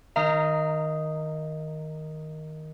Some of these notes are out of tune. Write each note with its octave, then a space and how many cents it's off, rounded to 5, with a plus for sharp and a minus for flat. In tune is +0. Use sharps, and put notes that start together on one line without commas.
D#3 +0 F5 -30 A#5 -15